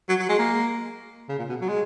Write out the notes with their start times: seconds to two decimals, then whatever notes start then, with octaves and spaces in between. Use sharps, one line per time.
0.09 F#3
0.19 F#3
0.29 G#3
0.38 A#3
1.29 C#3
1.39 A#2
1.49 B2
1.61 F#3
1.69 G#3